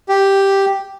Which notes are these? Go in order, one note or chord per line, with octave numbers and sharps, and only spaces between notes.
G4